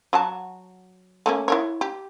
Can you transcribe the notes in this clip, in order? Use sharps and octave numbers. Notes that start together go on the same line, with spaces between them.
F#3 F#4 A5
A3 A#3 C#4
E4 A#4 C#5
G4